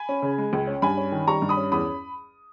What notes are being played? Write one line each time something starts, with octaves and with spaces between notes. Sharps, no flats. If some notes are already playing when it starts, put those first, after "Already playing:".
Already playing: G#5 B5
C#4
C#3
G#3
C#2
C#4
G2 G#5 B5
C#4
D#3
G3 A#5 C#6
G2
B5 D#6
C#4
E2 B5 D#6